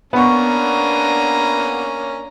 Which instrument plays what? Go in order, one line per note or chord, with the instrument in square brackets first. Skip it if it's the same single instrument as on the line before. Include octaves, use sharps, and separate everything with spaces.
[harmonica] A#3 C#4 [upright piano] B3 C#6 [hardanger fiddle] D4 A#5